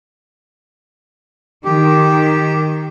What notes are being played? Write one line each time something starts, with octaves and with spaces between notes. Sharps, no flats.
D#3 G4